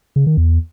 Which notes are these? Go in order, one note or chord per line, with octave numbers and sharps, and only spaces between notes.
C#3
D#3
E2